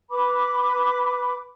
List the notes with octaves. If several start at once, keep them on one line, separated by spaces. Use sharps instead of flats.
B4 B5 D6